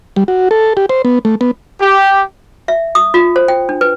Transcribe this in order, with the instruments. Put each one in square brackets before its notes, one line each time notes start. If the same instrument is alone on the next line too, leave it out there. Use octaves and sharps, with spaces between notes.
[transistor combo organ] G3
F#4
A4
G4
C5
B3
A3
B3
[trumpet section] G4
[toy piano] E5
D#6
F4
C5
G5
D4
B4